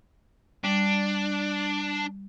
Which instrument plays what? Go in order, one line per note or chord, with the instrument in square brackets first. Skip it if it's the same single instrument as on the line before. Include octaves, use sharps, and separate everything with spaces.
[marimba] G3 [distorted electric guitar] D4